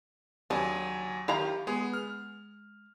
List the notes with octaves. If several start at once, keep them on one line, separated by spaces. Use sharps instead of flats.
D#2 C#3 F#3 D4 G#5
D#3 E4 G4 F5 A#5
G#3 B3 G#4
F6